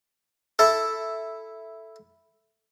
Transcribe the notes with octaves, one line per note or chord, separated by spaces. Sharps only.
E4 A4